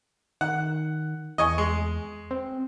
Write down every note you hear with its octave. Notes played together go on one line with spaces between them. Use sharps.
D#3 F#5
E2 D#5 G#5 C#6
G#3
C4